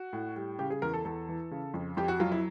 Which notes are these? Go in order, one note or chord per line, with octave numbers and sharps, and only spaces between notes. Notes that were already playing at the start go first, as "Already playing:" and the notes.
Already playing: F#4
A2
G3
C#3 G4
G#4
E2 A#4
A4
E2 A4
E3
C#3
F2
F2 G4
F#4
F#3 F4
E4